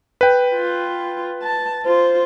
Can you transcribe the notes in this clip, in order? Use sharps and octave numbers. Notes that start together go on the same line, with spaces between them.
B4 G5
F4
A5
F4 C5